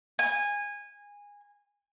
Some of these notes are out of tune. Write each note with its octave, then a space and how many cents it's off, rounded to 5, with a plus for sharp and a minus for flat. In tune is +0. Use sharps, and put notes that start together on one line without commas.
G#5 -20